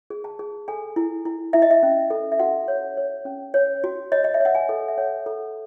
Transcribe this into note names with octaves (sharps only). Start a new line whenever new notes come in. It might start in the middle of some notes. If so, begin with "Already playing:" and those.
G#4
A5
G#4
A4 G#5
E4
E4
E4 E5
D#5
E5
C#4
A4
E5
F#4 F#5
C#5
C#5
C#4
C#5
F#4
C#5 D#5
D#5
E5
C#5 F#5
G#5
A4
E5
C#5 F#5
A4